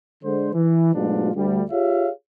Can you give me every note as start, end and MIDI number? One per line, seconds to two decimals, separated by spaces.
0.24 0.53 50
0.24 0.53 56
0.24 0.53 72
0.54 0.93 52
0.94 1.32 44
0.94 1.32 47
0.94 1.32 54
0.94 1.32 57
0.94 1.32 62
0.94 1.32 65
1.33 1.63 38
1.33 1.63 55
1.71 2.09 65
1.71 2.09 67
1.71 2.09 68
1.71 2.09 73
1.71 2.09 76
1.71 2.09 77